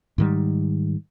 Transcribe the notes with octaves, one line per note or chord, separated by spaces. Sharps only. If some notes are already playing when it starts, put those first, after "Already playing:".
G#2 D#3 G3